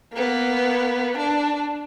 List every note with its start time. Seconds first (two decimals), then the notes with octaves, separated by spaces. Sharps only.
0.13 A#3 B3
1.17 D4